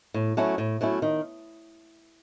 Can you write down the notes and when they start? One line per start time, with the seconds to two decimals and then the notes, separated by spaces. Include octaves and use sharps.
0.14 A2
0.37 F#3 A3 C#4 E4
0.58 A2
0.81 F#3 A3 C#4 E4
1.02 D#3